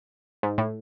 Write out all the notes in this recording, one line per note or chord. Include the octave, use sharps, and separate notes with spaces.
G#2
A2